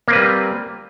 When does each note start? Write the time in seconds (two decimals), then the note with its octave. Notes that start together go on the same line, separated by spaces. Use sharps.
0.08 A#3
0.10 C4
0.13 B4
0.16 G3